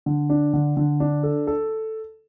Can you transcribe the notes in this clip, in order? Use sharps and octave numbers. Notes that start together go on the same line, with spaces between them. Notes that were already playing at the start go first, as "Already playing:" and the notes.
D3
D4
D3
D3
D4
A4
A4